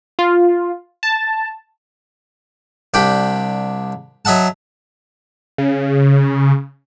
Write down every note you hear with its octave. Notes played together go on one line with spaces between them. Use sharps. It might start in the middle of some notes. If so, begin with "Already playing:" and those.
F4
A5
C2 D4 G4 G5 B5
F#3 D#5 E5 F#5 A5
C#3